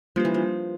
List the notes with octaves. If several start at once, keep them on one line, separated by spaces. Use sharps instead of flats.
F3 G3 A#3 D4 G4 B4
E3
F3